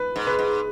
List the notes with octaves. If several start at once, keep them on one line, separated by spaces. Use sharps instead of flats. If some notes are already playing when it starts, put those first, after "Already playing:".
Already playing: B4
G#2
B4
G#2